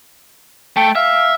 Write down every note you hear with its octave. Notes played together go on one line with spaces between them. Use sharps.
A3 G5
E5 F5